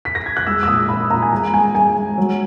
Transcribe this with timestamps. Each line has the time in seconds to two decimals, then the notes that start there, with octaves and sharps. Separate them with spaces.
0.05 B6
0.15 A#6
0.26 G#6
0.37 F#6
0.47 G#3 E6
0.63 E6
0.67 A#2 D#6
0.89 A#2 B5
1.10 A#2 A#5
1.22 G#5
1.32 G#3 A#5
1.54 G#3 G#5
1.75 G#3 G#5
1.96 G#3
2.18 F#3